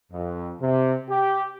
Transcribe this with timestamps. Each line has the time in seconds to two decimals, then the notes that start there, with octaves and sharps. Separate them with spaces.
0.12 F2
0.61 C3
1.10 G4